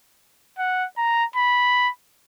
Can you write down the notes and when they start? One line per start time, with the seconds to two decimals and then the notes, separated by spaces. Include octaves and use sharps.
0.58 F#5
0.98 A#5
1.36 B5